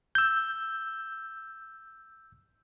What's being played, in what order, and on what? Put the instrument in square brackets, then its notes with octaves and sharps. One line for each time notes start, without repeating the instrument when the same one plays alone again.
[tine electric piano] E6 G6